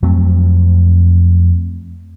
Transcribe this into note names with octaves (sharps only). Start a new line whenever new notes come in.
F2 F#3 A3 C4